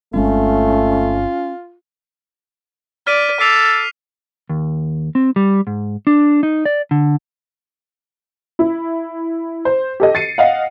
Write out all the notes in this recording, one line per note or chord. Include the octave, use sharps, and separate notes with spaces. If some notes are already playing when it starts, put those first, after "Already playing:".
G1 G#3 A3 C4 C#4 F4
D5 F6 B6 D#7
A4 D6 B6 C7 F7
D#2
C4
G3
G#2
D4
D#4
D5
D3
E4
C5
G4 A4 D#5
A6 C7 C#7 D#7
D#5 F5 F#5